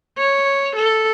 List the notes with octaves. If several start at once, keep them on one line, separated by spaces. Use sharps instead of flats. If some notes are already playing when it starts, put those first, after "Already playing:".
C#5
A4